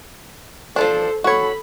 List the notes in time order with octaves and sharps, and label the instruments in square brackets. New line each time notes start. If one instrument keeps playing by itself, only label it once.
[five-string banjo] F3 F#3 D4 [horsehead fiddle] A4 C5
[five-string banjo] F#4 C#5 [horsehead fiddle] A4 B5